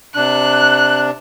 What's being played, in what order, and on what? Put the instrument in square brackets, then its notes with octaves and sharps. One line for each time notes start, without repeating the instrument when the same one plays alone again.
[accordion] C3 D4 [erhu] F#6